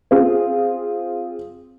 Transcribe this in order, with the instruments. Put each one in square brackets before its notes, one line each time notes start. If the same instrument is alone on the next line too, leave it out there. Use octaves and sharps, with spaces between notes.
[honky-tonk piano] C4 F4 G#4